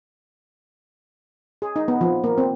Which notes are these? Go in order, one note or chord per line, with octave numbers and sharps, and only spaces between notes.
G#4
D#4
B3
F3
A#3
C4